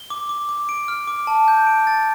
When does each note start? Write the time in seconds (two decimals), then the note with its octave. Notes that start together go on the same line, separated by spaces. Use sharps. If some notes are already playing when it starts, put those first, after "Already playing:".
Already playing: G7
0.10 D6
0.29 D6
0.49 D6
0.69 D7
0.88 F6
1.07 D6
1.27 A5
1.48 G6
1.67 D7
1.87 A6